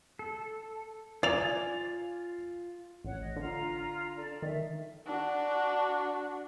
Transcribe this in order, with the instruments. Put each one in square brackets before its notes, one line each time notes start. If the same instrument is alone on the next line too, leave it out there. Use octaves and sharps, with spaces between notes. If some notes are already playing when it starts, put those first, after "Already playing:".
[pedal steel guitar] A4
[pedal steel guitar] F4 G#5 [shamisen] D5 [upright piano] A6 F7
[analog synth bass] A1 [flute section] C#5 F#5
[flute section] D#5
[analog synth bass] D3 [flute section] F4 A#5
[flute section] A4 D5
[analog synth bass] D#3 [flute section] E5
[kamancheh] D4 F#4